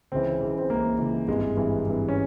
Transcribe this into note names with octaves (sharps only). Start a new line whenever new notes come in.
C#2 C#3 E3 C4
C#2 C#3 E3
C4
C#2 C#3 E3 A#3
C#2 C#3 E3
G#1 G2 E3 G#3
G#1 G2 E3
G#1 G2 E3
C#4